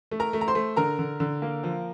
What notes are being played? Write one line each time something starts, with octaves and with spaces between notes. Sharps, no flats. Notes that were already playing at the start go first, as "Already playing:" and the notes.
A3
A#4 A#5
A3
A#5
C5 C6
A3
D3 A#4 A#5
D3
D3
A#3
F3